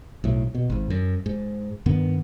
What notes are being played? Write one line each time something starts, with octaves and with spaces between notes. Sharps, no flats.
B1 A2
B2
G#1 G#2
F#2
G#2
G2 D#3 B3